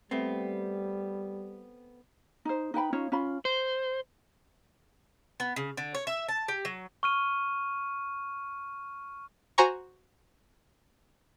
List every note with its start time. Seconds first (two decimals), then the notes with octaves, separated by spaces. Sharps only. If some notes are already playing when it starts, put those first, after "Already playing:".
0.11 G3 A3 B3 C4
2.45 D#4 C5
2.74 D#4 B4 G5 B5
2.93 C#4 D#4 F4 C#5
3.12 C#4 F4 B5
3.45 C5
5.40 B3
5.56 C#3
5.77 D3
5.95 C#5
6.07 E5
6.28 A5
6.48 G4
6.65 F#3
7.03 C#6 F6 D#7
9.58 F#4 C5 G#5 A#5 C#6